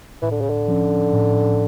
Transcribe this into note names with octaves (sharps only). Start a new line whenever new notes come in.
A2 E3
D3
C#3
D3
F3 C#4
A2